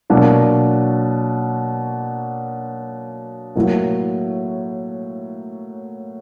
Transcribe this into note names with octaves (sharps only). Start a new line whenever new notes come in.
B2 F#3 A#3 D4 F#4
A2 F#3 A#3